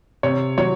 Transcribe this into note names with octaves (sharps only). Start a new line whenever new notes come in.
C3 C#5
F#3 C#5